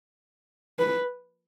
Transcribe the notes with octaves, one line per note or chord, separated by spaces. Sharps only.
B4